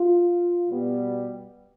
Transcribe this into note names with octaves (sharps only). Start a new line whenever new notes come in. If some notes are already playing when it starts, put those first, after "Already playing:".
Already playing: F4
B2 G3 B3